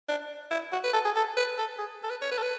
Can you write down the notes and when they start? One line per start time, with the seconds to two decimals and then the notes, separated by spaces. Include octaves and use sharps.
0.09 D4
0.51 E4
0.73 F#4
0.84 B4
0.93 A4
1.05 G#4
1.16 A4
1.37 B4
1.58 A4
1.78 G#4
2.04 A4
2.10 B4
2.22 C#5
2.32 B4
2.38 A4
2.43 B4